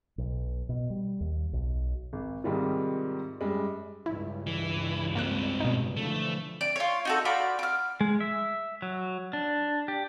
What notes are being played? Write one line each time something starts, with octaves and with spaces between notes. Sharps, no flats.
B1
B2
G3
D#2
B1
G#1
G#2 C3 D#3 G3 G#3 F4
F#2 G3 G#3
C#2 G2 E4
E3
G#2 A#3 C4 F#6
B2 D#4
D3 E3 F3 A3
D5
F4 C#5
D#4 F#4 A4
F4 F#4 D5 B5
D6 F6
G#3
E5
F#3
D4
G4